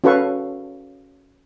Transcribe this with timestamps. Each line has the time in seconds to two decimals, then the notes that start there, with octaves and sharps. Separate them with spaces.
0.04 C#4 F#4 A4 B4 F5 C#6